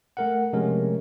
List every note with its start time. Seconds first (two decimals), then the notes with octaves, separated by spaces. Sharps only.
0.17 A3 A#4 F#5
0.53 C3 F3 G#3 A3 C#4 A#4